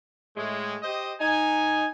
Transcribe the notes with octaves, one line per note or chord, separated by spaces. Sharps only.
A2 G#3
G4 C5 D#5
D#4 G#5